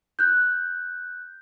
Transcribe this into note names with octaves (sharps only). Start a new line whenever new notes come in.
F#6 G6